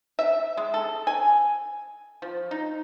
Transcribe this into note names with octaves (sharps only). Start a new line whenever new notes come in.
E5
G#3
A4
G#5
F3
D#4